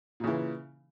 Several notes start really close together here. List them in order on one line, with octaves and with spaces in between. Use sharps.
A#2 C#3 E3